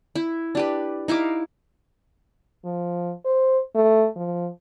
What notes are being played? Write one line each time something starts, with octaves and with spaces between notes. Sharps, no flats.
E4
D4 G4 B4
D#4 E4 F5 D6
F3
C5
A3
F3